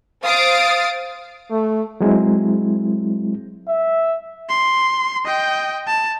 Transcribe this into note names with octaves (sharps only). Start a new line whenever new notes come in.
C5 F5 D#6 A6 C7 D7
A3
F#3 G#3 C4 E4
E5
C6
D#5 G5
A5